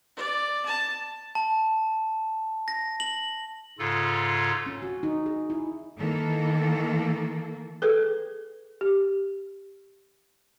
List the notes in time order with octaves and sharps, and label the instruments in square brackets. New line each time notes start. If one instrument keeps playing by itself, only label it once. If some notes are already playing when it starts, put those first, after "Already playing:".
[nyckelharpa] D5
A5
[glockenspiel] A5
A#6
F#7
[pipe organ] G#2 C#3 F4 A4
[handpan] C#4
F#4
D#4
G#4
E4
[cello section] D#3 E3 A#3 A4
[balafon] G#4 A4 B4
G4